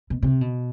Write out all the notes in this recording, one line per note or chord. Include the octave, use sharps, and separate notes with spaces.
B2
C3
B2